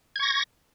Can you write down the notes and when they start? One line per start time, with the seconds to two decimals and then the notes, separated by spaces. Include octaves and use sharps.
0.16 G#6
0.19 C#6
0.23 A#6